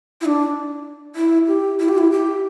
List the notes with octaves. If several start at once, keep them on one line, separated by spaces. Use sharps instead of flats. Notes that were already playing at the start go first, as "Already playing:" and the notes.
E4
D4
E4
G4
E4
G4
E4
G4